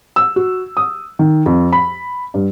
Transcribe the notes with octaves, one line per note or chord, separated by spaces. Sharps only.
E6
F#4
D#6
D#3
F2
B5
G2